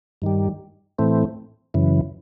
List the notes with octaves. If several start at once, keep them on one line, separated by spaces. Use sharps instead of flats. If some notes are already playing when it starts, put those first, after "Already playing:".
G2 D#3 G3
A2 E3 A3 C4
F#2 C#3 E3